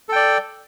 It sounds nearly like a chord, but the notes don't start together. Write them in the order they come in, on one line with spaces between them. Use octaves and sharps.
A4 G5 D5